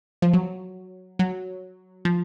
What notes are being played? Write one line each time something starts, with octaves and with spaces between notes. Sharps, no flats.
F3
F#3
F#3
F3